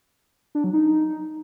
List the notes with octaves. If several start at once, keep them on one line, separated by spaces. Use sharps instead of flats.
D4
F#3
D#4